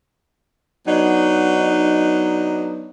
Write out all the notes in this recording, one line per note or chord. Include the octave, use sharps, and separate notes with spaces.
F#3 B3 D4 D#4